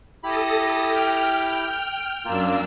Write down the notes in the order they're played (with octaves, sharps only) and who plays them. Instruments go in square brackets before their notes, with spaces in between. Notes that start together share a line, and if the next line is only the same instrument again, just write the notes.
[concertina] E4 G4 B5 [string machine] A4 D#6 A#6
[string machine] G5 F6
[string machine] F#2 D4 E6 [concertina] A#3 F4